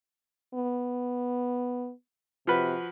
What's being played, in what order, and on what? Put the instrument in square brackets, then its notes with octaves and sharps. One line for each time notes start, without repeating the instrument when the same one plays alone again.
[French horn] B3
[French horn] C3 [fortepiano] F3 F#4 B4